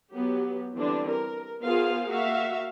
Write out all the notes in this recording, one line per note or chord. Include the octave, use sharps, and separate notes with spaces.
F#3 B3 G4
D3 E3 G3 C4 D4
A#4
B3 F4 G#4 A#4 C5 F5
A#3 F#4 E5 F5